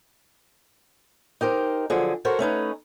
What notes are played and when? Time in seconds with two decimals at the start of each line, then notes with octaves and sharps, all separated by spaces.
1.41 D#4 G4 A#4 C5
1.90 D3 F3 F#3 G#4
2.25 F#4 A4 A#4 C5 C#5
2.39 A3 C#4 D#4 B4